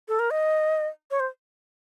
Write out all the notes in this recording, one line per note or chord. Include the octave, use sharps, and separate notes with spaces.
A4
A#4
D#5
C#5
C5